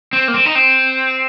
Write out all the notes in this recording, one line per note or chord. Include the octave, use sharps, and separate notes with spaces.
C4
A#3
C4
D#4
C4